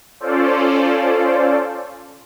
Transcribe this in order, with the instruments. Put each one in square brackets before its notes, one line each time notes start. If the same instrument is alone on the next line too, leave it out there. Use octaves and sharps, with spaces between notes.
[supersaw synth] C#4 F4 A4 C5 D5